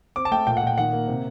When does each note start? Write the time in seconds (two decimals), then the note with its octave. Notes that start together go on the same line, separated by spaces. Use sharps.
0.16 C4 D6
0.25 A5
0.31 A3 G5
0.47 A#2 G5
0.57 F#5
0.63 A#2 G5
0.78 D#3 F#5
0.93 A#3
1.08 C3